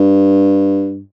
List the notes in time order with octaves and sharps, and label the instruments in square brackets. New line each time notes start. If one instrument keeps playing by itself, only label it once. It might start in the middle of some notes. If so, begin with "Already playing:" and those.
Already playing: [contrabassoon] G2